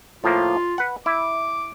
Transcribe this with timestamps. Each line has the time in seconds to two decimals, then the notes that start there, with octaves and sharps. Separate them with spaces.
0.24 A2 F3 A#3 F4
0.78 B4 F#5
1.06 E4 D6